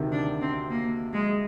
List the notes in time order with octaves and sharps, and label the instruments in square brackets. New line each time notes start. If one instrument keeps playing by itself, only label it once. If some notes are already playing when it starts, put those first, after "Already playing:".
Already playing: [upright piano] D2 C3 D#3
[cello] D4
C4
A#3
G#3